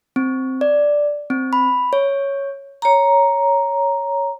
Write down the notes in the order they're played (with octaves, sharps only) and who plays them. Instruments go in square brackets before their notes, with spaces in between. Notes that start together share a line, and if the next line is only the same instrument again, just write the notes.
[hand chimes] C4
D5
C4
B5
C#5
[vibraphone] C#5 A#5